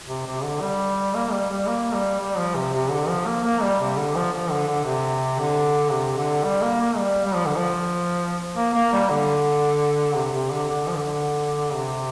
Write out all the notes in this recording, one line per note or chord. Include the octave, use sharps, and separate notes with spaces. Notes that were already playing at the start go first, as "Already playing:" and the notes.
C3
C3
D3
G3
A#3
G3
G3
A#3
G3
G3
F3
C3
C3
D3
F3
A#3
A#3
G3
C3
D3
F3
F3
D3
D3
C3
D3
C3
D3
G3
A#3
A#3
G3
G3
F3
D3
F3
A#3
A#3
G3
D3
C3
C3
D3
D3
F3
D3
C3